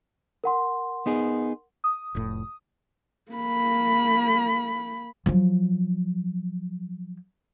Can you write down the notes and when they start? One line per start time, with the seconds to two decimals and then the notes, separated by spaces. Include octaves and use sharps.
0.44 A#4 F#5 C6
1.06 B3 D#4 G#4
1.84 D#6
2.15 F1 A2
3.32 A#3 B5
5.26 F3 F#3